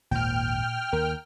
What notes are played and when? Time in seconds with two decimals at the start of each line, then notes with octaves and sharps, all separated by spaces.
0.11 G#1 D#2 A#2 G5 F6
0.93 D#2 A#4